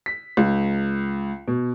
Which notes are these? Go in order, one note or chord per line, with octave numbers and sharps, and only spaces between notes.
B6
C#2
B2